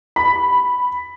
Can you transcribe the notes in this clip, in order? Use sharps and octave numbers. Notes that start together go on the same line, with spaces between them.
B5